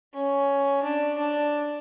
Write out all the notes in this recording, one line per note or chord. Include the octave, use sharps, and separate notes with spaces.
C#4
D4
D4